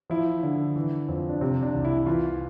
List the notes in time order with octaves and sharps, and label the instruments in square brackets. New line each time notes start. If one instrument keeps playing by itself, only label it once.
[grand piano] F3 E4
D3
E3
F2
D4
C3 C4
D4
C2
E4
E3 F4